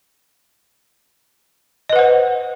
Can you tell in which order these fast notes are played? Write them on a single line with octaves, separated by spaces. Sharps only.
D#5 B4 F#5 C5